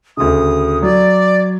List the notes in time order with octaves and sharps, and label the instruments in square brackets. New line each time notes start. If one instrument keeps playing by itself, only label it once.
[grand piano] D2 C#3 [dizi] D#6
[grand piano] F#3 [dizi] D5